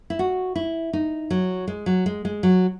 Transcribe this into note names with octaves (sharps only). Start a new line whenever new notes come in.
E4
F#4
E4
D#4
F#3
G#3
F#3
G#3
G#3
F#3